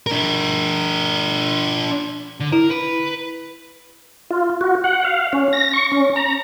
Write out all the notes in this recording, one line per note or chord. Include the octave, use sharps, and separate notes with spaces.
D4 A#4
D3
E4 A#4
B4
F4
F#4
F#5
F5
C#4
A#6
C#6
C#4
A#5